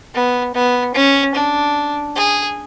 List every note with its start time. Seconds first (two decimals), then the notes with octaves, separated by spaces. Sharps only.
0.14 B3
0.55 B3
0.95 C#4
1.35 D4
2.16 G#4